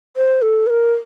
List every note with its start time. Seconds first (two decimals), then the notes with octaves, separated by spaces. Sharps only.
0.17 C5
0.42 A4
0.67 B4
0.70 A#4